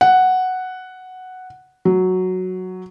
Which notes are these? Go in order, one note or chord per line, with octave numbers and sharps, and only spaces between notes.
F#5
F#3